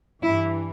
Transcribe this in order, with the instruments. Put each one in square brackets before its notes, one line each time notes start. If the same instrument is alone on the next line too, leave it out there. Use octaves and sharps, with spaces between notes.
[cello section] G2 E3 E4